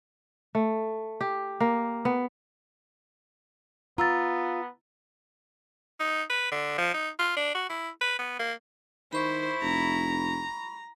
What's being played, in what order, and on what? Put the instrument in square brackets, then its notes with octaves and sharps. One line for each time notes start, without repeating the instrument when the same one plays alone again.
[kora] A3
G4
A#3
B3
[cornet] B3 [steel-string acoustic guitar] F4 [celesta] A#5 E6 A6
[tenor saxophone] D#4
B4
D3
F3
D#4
F4
D4
F#4
E4
B4
B3
A#3
[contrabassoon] D#3 [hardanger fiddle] E4 [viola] C5 [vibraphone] B5 C#6
[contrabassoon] F1 [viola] A#5